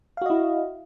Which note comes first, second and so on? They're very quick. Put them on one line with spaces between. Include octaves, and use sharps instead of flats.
F5 F#4 D#5 E4